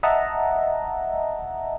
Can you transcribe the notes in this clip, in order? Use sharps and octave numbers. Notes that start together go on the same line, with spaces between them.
D#5 E5 F#5 A5 A#5